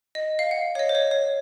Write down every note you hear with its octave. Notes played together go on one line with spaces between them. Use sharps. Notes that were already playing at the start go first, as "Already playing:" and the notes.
D#5
F5
F#5
C#5
D#5
C5
C#5
C#5